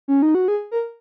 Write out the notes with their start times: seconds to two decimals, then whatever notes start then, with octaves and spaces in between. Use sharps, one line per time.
0.08 C#4
0.22 D#4
0.35 F#4
0.48 G#4
0.71 A#4